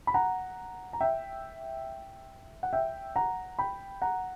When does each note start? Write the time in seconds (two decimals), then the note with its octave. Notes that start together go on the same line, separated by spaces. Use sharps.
0.07 B5
0.14 F#5 A#5
0.93 A#5
1.00 E5 G5
2.63 F#5
2.73 E5 G5
3.16 F#5 A#5
3.59 G5 B5
4.02 F#5 A#5